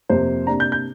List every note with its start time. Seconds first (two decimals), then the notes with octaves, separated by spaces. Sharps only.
0.09 F2 C3 A#3 C5
0.47 C3 A#3 D4 A#5
0.60 G6
0.72 G6